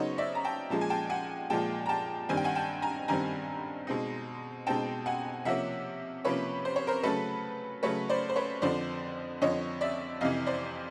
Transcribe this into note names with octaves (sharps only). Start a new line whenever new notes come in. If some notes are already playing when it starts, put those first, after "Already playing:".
Already playing: C#3 F#3 B3 D#4 C5 C#5 D#5
D5 E5
A#5
G5 A5
A#2 F3 G#3 A5
G#5
G5 A5
F#5 G#5
A#2 F3 G#3 G5 A5
A#5
G5 A5
G2 D#3 G3 C4 G#5
G5
F#5 G#5
G5 A5
G#5 A#5
G2 D#3 G3 C4 G#5 A#5
B2 G#3 C4 D#4
B2 G#3 C4 D#4 G5 A5
F#5 G#5
C3 F3 A#3 C#4 E5 F#5
C3 F3 A#3 C#4 B4 C#5
C5
C#5
A#4 C5
C#3 F#3 A3 A4 B4
C#3 F#3 A3 B4 C#5
C5 D5
C5
B4 C#5
F2 D3 F3 C5 D5
F2 D3 F3 C#5 D#5
D5 E5
F2 C3 E3 D#5 F5
C5 D5